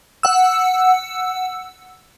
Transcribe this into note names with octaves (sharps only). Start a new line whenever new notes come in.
F#5 E6